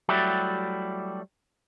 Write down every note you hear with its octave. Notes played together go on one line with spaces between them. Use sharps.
F#3 G3 A3 E4 F#4 G4